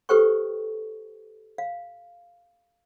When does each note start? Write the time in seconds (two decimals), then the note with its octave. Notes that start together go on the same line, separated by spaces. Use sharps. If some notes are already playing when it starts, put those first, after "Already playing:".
0.09 G4 A4 B4 C5 G5 C#6
1.58 F5